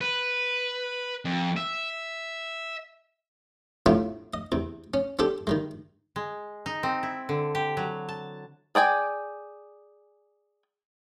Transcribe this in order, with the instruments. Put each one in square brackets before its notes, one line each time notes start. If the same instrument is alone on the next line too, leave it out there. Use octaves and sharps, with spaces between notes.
[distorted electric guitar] B4
F2
E5
[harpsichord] A2 C3 B3 D4 E4 F4
D#5
E2 C3
C#4
C4 D4 G4 A4
D#3 G3 G#3
[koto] G#3
D#4
C4
E4
D3
G4
F#3
A5
[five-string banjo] G#4 D5 G5 G#5